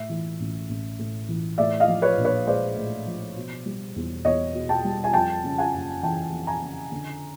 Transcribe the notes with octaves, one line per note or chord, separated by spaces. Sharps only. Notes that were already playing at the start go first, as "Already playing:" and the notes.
Already playing: A2 E5
E3
A1
A1
A2
E3
A2 D5 E5
D#5 F5
F3
B4 C#5
A#1
B4 C#5
G#3 C5 D5
A2
F3
B2
G3
E2
E2 C#5 D#5
B2
G5 A5
G3
G#5
F2 G5 A5
C#3
F#5 G#5
F#1
E3 G5 A5
F2
G#5 A#5
C#3
D3